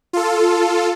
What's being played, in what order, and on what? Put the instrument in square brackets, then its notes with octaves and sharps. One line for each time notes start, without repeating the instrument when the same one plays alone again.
[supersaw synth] F4 A4